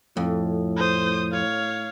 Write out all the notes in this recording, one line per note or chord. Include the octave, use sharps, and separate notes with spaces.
F2 A2
C5 D#6
C#5 F5